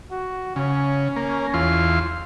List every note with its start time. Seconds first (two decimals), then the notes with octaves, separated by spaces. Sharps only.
0.11 F#4
0.56 C#3 C#4
1.16 A#3
1.54 E2 F4 C6